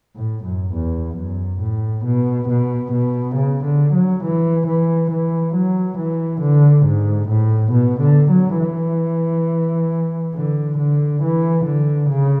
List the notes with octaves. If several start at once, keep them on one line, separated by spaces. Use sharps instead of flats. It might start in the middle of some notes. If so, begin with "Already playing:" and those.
A2
F#2
E2
F#2
A2
B2
B2
B2
C#3
D3
F#3
E3
E3
E3
F#3
E3
D3
G#2
A2
B2
D3
F#3
E3
D3
D3
E3
D3
C#3